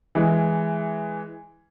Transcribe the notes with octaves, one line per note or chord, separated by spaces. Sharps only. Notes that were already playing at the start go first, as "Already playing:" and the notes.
E3 G#3